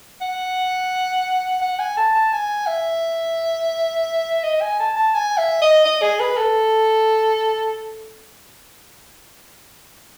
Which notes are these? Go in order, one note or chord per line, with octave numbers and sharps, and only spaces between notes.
F#5
F#5
G#5
A5
A5
G#5
E5
D#5
G#5
A5
A5
G#5
E5
D#5
D#5
G#4
B4
A4